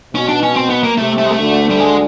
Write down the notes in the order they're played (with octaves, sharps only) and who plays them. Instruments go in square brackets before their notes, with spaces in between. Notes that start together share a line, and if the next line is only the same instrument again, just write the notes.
[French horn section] B2 [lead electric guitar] C#4
[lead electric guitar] D4
C#4
C4
B3
A#3
[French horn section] C3 [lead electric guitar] A3
[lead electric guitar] A3
G#3
A3
[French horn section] D2 D3
[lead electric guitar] G3
G#3